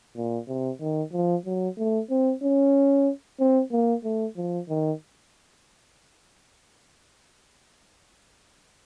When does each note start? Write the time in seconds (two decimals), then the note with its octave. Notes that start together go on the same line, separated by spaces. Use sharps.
0.16 A#2
0.48 C3
0.80 D#3
1.13 F3
1.46 F#3
1.78 A3
2.10 C4
2.42 C#4
3.39 C4
3.72 A#3
4.04 A3
4.37 F3
4.69 D#3